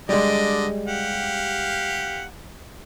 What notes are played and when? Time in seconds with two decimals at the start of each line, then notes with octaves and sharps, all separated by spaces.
0.09 D3 G3 G#3 D5 D#5
0.87 G4 F5 F#5